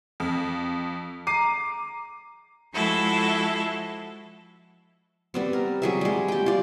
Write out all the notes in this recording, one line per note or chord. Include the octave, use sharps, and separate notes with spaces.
F2
A#5 D6 C7 D#7
F3 G#3 E4 F#4 A4
G3 B3 C4
A#4
F#3 G#4 E5
G3 G#3
G4 G5
F4 D5